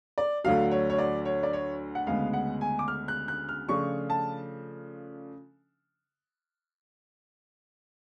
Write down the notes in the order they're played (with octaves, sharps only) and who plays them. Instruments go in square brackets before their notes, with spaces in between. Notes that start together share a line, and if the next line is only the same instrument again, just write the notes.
[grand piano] D5
D2 D3 F#3 F5
C#5
C#5
D5
C#5
D5
C#5
F#5
D2 C#3 G#3 B3 F5
F#5
G#5
D6
F6
F#6
F#6
F6
C#3 F3 A3 D4 F4 C#6
A5